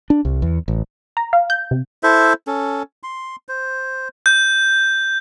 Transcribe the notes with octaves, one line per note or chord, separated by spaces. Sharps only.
D4
C2
E2
A1
A#5
F5
G6
C3
E4 A4 C5 E5
C#4 A4
C6
C5
G6